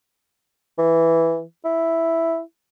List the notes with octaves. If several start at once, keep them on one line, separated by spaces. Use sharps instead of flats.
E3
E4